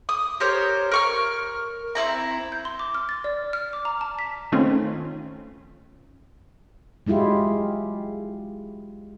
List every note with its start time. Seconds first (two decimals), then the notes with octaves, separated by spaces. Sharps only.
0.09 D#6
0.40 G4 A#4 C5 C#5
0.91 A#4 C#6 F6
1.95 C4 C#4 E4 A#5
2.52 G6
2.65 C6
2.79 D6
2.95 F6
3.09 A6
3.24 D5
3.53 F6
3.73 D6
3.85 A#5
4.01 A5
4.19 B6
4.52 D#3 A3 C4 C#4 F4
7.06 F#3 G#3 E4 F4 G4